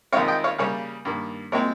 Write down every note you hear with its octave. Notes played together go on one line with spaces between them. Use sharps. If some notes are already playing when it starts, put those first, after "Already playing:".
F2 D#3 G#3 C4 C#5 F5
D#5 G5
C#5 F5
C#3 G3 A#3 C#5 F5
G2 D#3 A#3
A#2 G#3 C4 A#4 C#5